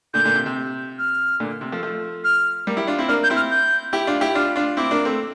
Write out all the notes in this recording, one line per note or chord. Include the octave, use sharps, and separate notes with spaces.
A#2 D3 G6
A#2 D3
C3
C3
F6
A#2 D3
C3
F3 A3
F3 A3
F6
G3 A#3
E4 G4
D4 F4
C4 E4
A#3 D4 F6
G6
C4 E4
F6
G6
E4 G4
D4 F4
E4 G4
D4 F4 F6
D4 F4
C4 E4 D6
A#3 D4
A3 C4